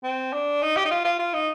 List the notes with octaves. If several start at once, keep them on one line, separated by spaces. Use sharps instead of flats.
C4
D4
D#4
G4
D#4
F4
F4
F4
D#4